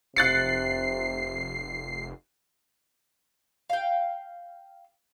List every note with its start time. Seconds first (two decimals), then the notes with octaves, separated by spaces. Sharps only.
0.16 F1 C3 F#6 A6 C7 C#7
3.70 F5 G5